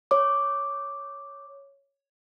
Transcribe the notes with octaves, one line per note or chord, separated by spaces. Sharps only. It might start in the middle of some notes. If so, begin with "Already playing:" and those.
C#5 D6